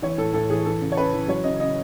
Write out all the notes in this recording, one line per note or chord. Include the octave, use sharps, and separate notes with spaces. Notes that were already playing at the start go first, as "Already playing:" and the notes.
E3 C#5
A2 A4
A2 A4
E3 G#4
E3 A4
C#3
C#5
C#3 B4
E3
F#3 C#5
C#3 D#5
C#3 D#5